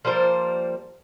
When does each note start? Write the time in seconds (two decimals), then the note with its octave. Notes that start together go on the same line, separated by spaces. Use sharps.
0.05 F3 G3 A#3 C5